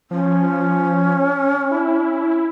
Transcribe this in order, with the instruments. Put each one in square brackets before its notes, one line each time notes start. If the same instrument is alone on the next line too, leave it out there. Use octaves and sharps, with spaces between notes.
[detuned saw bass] F3 [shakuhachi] C#4
[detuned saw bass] E4